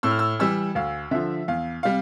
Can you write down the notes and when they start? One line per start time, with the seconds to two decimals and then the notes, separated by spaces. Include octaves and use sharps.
0.03 A2 E6
0.11 F6
0.19 E6
0.39 E3 G3 E6
0.75 D2 F5
1.11 D3 F3 E5
1.48 E2 F5
1.83 C3 G3 F5